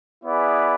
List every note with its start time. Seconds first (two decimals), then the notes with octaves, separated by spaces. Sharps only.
0.24 B3 E4 G#4 B4 D5